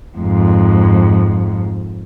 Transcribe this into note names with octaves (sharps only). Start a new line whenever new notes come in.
F2 G#2